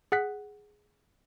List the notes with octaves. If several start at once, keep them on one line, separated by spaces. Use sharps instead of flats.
G#4 F#5 F#6 B6